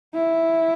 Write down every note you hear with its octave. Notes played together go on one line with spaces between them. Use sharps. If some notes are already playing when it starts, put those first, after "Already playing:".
E4